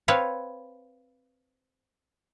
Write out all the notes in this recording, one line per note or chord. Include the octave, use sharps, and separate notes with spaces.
C4 B4 C#5 F5